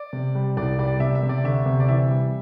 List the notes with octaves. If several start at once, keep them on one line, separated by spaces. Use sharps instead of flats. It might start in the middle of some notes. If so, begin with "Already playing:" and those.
Already playing: D5
C3
G3
C2 D5
G3 D5
C3 E5
E5
C3
D5
D2 E5
C3
D5
E3 E5
G3